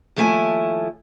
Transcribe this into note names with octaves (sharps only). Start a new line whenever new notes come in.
D#2 F3 A3 E4 D#5 G#5